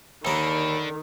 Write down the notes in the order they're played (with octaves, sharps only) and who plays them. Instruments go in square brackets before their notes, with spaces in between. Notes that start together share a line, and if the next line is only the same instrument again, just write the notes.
[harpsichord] D#2 A#3 [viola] D#3 [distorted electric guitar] D4 A4 [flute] B5